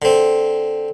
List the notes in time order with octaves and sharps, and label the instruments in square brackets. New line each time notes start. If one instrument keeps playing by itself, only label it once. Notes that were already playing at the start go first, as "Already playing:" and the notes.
[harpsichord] D3 C4